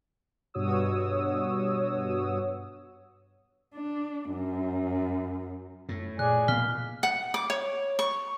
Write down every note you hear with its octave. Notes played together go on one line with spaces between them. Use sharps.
G2 B2 F#4 C#5 D#6 E6
D4
F#2
F#2 A2
A#2 G#4 D5 G#5 F#6
B2 A#3 F5 F6 B6 G7
F#5
D6
C#5
C#6